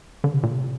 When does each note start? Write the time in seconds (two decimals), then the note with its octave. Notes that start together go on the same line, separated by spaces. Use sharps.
0.24 D3
0.33 C3
0.43 A#2
0.53 C3